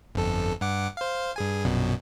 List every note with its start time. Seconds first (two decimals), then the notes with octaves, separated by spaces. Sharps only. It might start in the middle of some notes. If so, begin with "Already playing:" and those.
0.15 G1 F2 A4
0.61 G2 F#5 D6
0.97 C5 F5
1.36 G2 G#4 G#5
1.65 A#1 F#2 B2